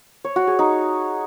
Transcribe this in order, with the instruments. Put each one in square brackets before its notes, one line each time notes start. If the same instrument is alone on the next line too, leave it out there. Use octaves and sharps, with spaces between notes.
[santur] C#5
F#4
G#4
D#4